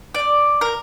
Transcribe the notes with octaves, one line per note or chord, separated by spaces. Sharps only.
D5
A#4